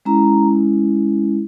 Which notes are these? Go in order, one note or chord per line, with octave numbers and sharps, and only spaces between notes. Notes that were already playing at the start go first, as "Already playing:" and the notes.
G#3 C#4 E4 A#5